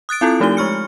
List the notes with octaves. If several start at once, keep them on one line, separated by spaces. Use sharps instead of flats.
D#6 F#6 A6 D7
C4 E4 F4 A4
F3 A3 D#4 G4 G7
G#3 C#6 F6 C#7